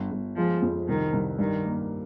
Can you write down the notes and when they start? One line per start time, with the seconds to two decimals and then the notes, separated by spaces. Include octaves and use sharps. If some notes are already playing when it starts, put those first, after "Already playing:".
Already playing: G1
0.11 G1
0.36 F3 G#3
0.62 F2
0.88 C2 D#3
1.13 C2
1.39 G2 D#3
1.65 A#3